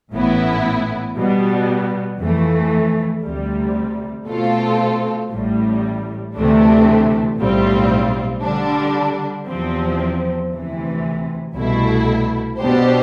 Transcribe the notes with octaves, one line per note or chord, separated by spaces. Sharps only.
A1 A2 E3 B3 E4
B2 G3 B3
F2 E3 A3
D2 C3 G3
B2 A3 C4 F4 A4
A1 A2 G3
D2 C3 E3 A3 D4
B1 A2 G3 C4 F4
D3 G3 D4
E2 C3 F3 C4
D2 C3 E3
C2 B2 A3 E4
B2 B3 D4 G4 C5